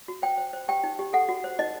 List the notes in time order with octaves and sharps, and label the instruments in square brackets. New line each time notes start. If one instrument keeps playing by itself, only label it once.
[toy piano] F#4
C5 G5
C5
C5
G4 G5
D#4
G4
A4 F#5
F#4
C5
D#4 D#5